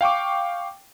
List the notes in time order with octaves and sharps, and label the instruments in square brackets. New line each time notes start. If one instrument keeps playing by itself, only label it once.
[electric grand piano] F5 G5 C#6 D6